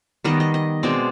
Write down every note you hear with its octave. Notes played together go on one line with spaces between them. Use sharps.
D#3 G3 B3 D#5
D#5
D#5
B2 G#3 C4 D5